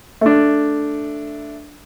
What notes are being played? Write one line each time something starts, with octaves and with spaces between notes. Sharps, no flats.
A3 D4